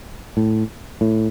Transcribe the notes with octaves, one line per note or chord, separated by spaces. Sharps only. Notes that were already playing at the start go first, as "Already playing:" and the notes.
A2
A2